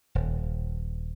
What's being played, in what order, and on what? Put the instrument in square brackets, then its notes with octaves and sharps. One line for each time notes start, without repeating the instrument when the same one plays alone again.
[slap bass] D#1